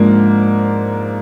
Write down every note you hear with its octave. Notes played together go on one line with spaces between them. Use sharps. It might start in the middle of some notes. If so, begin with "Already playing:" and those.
Already playing: G#2 F3 A#3 D4